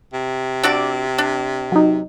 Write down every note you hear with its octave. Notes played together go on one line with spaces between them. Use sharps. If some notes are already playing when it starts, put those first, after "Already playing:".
C3
D4 F#4 D5 D6 E6
D4
F#3 D#4